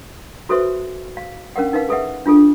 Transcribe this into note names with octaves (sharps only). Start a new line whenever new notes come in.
F#4 A4 B4 C5 E5 C#6
F5
C#4 A#4 F5 F#5
D#4 A#4 B4 F5
G#4 A4 B4 E5 F#5
D4 F4 G#4 A4